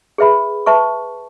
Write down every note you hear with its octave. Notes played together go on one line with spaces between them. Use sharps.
G#4 B4 E5 B5
B4 E5 A5 C#6